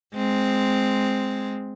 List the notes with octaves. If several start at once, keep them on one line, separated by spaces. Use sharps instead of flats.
G#3 C4